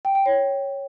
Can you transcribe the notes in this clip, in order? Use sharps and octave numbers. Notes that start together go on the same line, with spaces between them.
G5
G5
C#5